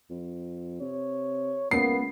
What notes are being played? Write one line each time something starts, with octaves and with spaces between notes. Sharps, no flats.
F2
C3 C#5
C#2 A#3 B3 C7